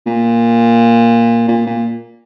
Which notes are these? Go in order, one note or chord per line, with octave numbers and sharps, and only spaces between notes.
A#2
A#2
A#2